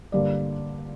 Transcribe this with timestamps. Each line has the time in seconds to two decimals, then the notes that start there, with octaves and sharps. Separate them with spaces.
0.12 G2 D3 G3 A#3 D5